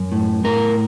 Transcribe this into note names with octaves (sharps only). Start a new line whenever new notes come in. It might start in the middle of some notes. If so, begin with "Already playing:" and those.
Already playing: F#2
A2
A2 A#4